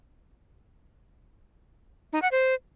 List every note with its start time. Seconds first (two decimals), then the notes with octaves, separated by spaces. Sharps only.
2.13 D#4
2.22 F#5
2.32 C5